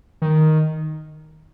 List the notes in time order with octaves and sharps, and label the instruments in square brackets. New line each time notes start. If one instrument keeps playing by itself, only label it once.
[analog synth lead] D#3